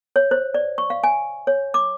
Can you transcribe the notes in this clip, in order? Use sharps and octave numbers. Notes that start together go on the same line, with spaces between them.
C#5
C5
D5
C#6
F5
G#5
C#5
D6